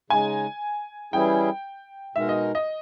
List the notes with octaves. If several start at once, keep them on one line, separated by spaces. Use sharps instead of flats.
C#3 G#3 D#4 G#5
E3 G3 C#4 E4 G#4 G5
B2 G#3 D#4 A#4 E5
D#5
D#5